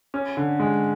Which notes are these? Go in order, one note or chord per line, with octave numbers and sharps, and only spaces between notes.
C#4
D3
G#3